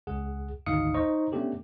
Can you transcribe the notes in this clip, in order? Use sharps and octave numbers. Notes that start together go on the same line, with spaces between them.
C#2 G#4 F#5
G#1 D2 D#4 F5 D#6 C#7
D#4 C5 D#5 A#5 C#6
A3 B3 C#4 D4 G4 A4